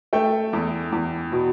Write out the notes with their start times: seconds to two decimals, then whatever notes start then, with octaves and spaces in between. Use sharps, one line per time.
0.13 A3 G5
0.53 E2
0.92 E2
1.32 B2